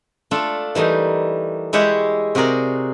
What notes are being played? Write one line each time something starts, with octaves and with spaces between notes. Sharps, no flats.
A3 D4 F4 A4
E3 G3 A3 D#4 A#4
G#3 E4 G4 C#5 E5 F#5
C3 F#4 G#4 A#4 D5